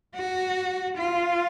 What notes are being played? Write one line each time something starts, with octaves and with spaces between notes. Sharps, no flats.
F#4
F4